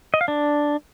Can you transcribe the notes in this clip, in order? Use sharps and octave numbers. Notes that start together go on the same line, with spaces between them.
D#5
F5
D4